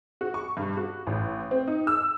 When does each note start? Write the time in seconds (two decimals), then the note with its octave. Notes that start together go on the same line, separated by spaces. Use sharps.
0.21 F#4
0.34 C#6
0.57 G2
0.77 F#4
1.07 A1
1.51 C4
1.68 D#4
1.87 E6